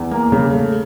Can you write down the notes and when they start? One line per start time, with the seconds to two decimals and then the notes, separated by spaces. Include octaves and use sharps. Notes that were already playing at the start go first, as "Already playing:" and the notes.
Already playing: E2
0.11 A#3
0.32 C#3
0.53 A3